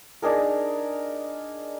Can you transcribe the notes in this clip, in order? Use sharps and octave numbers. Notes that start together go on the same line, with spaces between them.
D4 D#4 G#4 A#4